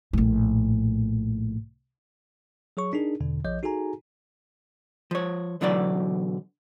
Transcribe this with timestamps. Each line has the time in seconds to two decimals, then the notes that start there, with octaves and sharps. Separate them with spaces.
0.13 A#1 A2
2.77 F#3 G#4 C#5 C#6
2.93 D4 D#4 G#4 A#4
3.20 E2 B2 D3
3.44 A#1 F3 C#5 D#5 G6
3.63 D#4 F#4 G#4 A4 G#5 A#5
5.11 F3 C#5
5.61 B1 D3 E3 F#3 D5